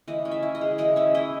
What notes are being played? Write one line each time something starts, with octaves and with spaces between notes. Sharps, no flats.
E3 D#5
C#4
E5
E4
D#5
G#3
E3 D#5
C#4 E5
E4 D#5